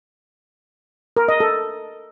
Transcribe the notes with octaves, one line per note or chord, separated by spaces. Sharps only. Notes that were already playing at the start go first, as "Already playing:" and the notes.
A#4
D#5
A4